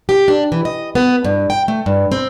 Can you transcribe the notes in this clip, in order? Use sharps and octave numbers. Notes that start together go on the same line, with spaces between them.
G4
D4
E3
D#5
B3
G2
G5
A3
G2
C4